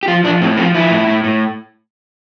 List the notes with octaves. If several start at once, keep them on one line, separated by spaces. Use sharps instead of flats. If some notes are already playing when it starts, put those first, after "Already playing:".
G4
F3 F4
F3 D4
A2 C4
F3 C4
F3 E4
A2
A2
A2